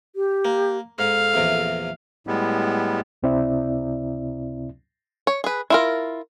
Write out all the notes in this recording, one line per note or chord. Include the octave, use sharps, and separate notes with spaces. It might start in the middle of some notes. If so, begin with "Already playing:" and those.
G4
A#3
G#2 A4 F5
A#1 E2 C3
A2 G3 G#3 B3
C#2 C3 C4 E4 D5 E5
C#5
G#4 B4
E4 F4 A#4